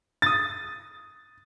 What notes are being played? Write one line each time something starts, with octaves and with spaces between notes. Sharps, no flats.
D#6 A6